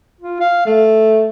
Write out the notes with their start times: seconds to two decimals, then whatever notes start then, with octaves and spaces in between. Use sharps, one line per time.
0.21 F4
0.40 F5
0.66 A3